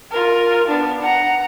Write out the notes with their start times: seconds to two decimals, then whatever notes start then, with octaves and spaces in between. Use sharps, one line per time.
0.11 F4 A#4
0.68 B3 D4
1.02 F#5 A#5